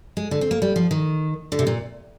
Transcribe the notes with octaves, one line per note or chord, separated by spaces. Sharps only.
G#3
D3
C4
A#3
G3
F3
D#3
D3
C3
A#2